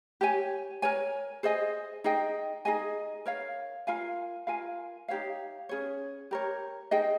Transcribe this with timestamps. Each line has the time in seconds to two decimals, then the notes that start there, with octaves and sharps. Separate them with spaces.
0.21 G4 C#5 G#5
0.82 A#4 C#5 G#5
1.43 G#4 C5 D#5 G#5
2.04 D#4 G#4 D#5 G5
2.65 D#4 G#4 D#5 G#5
3.26 A#4 C#5 F5
3.87 F4 A#4 F5 G#5
4.47 F4 A#4 F5 G#5
5.08 D#4 G4 C#5 F5
5.69 C#4 G#4 C#5
6.31 G4 A#4 C#5
6.91 D#4 G#4 D#5 G5